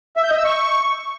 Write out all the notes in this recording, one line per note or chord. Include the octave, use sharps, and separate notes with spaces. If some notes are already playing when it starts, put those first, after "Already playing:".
E5
G6
D#5
E6
C#6